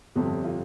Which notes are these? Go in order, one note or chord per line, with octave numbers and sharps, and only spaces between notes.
G1 F2 C3 G3 G4
F4